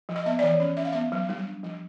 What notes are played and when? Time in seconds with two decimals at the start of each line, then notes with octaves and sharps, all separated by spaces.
0.09 F3
0.16 D#5
0.26 B3 E5
0.39 D5
0.42 E3 C#5
0.60 C#4
0.77 C#4 E5
0.85 F5
0.93 B3 E5
1.12 F#3
1.29 G3
1.46 D4
1.63 F3